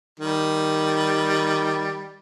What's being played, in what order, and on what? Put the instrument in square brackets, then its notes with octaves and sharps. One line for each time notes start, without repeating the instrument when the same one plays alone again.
[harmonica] D#3 G3